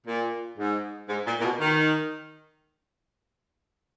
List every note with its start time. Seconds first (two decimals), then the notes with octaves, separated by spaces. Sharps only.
0.06 A#2
0.58 G#2
1.09 G#2
1.26 A#2
1.40 A#2
1.43 B2
1.60 D#3